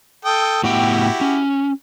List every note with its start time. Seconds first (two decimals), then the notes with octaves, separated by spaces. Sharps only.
0.25 A4 G5 D#6
0.64 A2 B3 E4 F#4 G4 G5
1.21 C#4